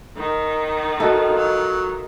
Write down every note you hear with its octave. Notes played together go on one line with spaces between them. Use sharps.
D#3
F#4 A4 D#5 E5
F#3 F4